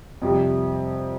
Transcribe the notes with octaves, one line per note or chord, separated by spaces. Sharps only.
F2 C3 G3